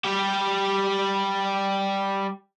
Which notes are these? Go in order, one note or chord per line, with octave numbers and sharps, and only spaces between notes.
G3 G4